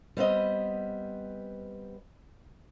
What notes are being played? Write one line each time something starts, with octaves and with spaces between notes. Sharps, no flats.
G3 B3 C4 D#5